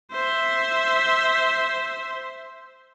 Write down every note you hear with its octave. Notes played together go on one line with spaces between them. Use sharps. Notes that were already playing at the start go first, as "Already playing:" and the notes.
C5 E5